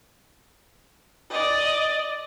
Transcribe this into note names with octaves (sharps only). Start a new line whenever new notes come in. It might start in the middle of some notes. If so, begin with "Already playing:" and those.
D5 D#5